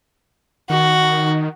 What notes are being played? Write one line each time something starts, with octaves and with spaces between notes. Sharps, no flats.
D#3 F#4